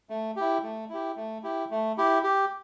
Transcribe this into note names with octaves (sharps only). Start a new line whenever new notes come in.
A3
E4 G4
A3
E4 G4
A3
E4 G4
A3
E4 G4
G4